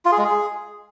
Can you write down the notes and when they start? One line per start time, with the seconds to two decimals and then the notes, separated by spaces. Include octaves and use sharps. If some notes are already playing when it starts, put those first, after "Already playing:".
0.05 F4
0.12 G#4
0.18 G#3
0.25 G#4